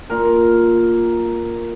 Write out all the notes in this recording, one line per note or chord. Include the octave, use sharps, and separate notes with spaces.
A#2 A#4